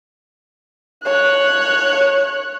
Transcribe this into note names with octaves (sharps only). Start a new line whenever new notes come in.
C#5 F#6